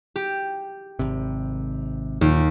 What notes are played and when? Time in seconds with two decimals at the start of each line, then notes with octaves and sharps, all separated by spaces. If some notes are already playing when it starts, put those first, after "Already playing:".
0.16 G4
0.99 G#1 C3
2.21 D#2 A#2